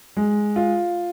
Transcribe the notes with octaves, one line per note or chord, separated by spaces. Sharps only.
G#3
F4